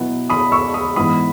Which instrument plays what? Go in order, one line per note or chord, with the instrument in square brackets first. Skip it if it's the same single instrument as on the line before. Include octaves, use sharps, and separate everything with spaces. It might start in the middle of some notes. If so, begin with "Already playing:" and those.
Already playing: [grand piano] B2 F#3 B3 E4
B5 D#6
C#6 E6
B5 D#6
G#2 E3 B3 B5 D#6